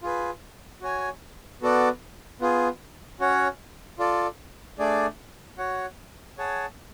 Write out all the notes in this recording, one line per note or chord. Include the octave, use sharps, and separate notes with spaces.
F4 G#4 B4
F#4 C#5 G#5
B3 F#4 A4 D5
B3 F4 G#4
C#4 F#4 C#5 F#5
F4 A4 D5
A3 D4 G#4 D5
F#4 C#5 F#5
G#4 C#5 F#5 A5